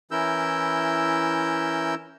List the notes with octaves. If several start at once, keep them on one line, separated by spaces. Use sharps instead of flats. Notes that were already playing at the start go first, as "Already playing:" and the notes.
E3 C#4 E4 A#4 E6 G6